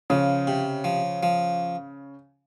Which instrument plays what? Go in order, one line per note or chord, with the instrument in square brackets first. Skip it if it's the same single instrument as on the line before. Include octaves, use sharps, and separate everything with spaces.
[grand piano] C#3 [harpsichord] F3
[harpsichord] C3
F3
F3